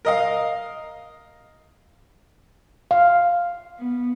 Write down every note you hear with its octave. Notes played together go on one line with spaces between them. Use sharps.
A#4 D#5 F5
F5
B3